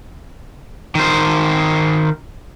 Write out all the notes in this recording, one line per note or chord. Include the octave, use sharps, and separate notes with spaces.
D#3 C5